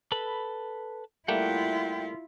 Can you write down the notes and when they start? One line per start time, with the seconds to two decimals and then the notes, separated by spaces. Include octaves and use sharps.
0.12 A4 B4 B5
1.28 G3 A3 A#3 E4 F4 F#5 G5